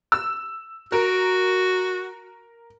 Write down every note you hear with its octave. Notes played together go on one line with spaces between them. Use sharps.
E6
F#4 A#4